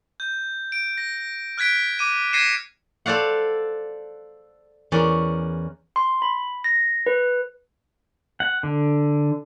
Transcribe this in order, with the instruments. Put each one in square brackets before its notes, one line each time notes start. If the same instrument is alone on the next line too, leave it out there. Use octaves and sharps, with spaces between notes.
[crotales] G6
D7
A#6
F6 F#6 G#6 B6 D7
D6 D#7
G#6 A#6 C7 C#7 D#7 E7
[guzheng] A4 C5 D5 F5 F#5
E2 C#4 A#4 D5
[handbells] C6
B5
A#6
B4
[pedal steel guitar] F#5
D3